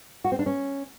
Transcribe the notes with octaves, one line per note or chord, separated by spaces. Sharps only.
F#4
C4
D4
C#4